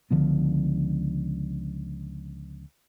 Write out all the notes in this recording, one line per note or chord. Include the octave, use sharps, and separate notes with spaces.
C#2 D3 F3 B3